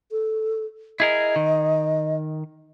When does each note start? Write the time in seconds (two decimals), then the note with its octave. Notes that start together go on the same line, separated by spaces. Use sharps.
0.11 A4
1.00 E4 G#4 A#4 D#5
1.36 D#3